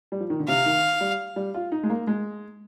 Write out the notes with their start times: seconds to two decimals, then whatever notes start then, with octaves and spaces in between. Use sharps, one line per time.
0.12 G3
0.20 F3
0.30 D#3
0.39 D3
0.48 C3 F5
0.66 D#3
1.01 G3
1.36 G3
1.54 F4
1.72 D#4
1.84 G#3
1.90 A#3
2.07 G#3